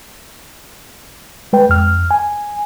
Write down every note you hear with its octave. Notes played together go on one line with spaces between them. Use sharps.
G#3 B4 G5
F2 F6
G#5